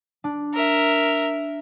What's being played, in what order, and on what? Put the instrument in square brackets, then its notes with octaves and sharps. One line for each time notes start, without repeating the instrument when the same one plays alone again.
[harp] D4
[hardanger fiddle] A#4 E5